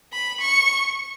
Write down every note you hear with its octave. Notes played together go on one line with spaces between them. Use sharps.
B5
C#6